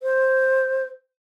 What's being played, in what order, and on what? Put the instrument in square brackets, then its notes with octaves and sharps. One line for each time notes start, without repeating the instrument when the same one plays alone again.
[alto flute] C5